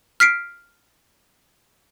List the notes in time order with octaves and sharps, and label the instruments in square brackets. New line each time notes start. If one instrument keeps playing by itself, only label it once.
[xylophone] F6 B6 C7 D7